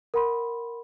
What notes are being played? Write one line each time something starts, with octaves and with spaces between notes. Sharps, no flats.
A#4 F#5 B5 C6